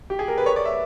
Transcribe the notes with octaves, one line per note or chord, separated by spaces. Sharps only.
G4
G#4
A#4
B4
C#5
D5
E5